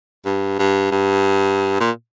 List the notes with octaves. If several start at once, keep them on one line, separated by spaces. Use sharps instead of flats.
G2
G2
G2
A#2